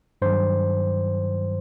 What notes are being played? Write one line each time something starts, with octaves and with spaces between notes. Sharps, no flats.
G2 D#3 F#3 C5